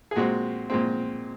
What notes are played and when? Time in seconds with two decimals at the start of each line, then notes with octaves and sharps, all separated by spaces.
0.11 G#4
0.16 A#2 G#3 C4 F#4
0.70 A#2 G#3 C4